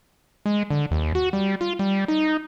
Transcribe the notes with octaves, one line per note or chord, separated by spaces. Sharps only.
G#3
D3
D#2
F#4
G3
F4
G3
D#4